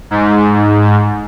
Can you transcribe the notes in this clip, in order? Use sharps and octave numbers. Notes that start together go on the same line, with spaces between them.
G#2